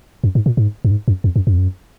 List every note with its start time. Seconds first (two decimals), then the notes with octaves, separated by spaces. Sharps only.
0.24 F#2
0.35 G#2
0.46 A#2
0.57 G#2
0.85 F#2
0.91 G#2
1.08 F#2
1.24 F2
1.36 F#2
1.47 F#2
1.53 F2
1.58 F#2